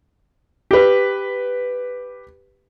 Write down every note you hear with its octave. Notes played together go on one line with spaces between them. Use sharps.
G4 B4